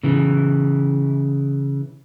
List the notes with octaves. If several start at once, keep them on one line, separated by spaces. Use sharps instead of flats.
C#3 E3